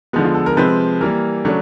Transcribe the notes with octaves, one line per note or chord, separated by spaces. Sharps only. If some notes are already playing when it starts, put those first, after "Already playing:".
D3 F3 G#3 B3
F4
A4
A#4
C3 F3 G#3 C4 B4
E3 G3 A#3 A#4
C#3 F#3 A3 D4